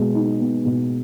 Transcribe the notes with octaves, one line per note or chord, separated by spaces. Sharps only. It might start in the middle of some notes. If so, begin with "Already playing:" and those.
Already playing: B2 G#3
D#4
B3
B2